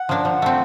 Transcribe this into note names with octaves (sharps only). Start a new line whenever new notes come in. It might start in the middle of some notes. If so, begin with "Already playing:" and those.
Already playing: F#5
F3 A#3 D4
F3
A3 C4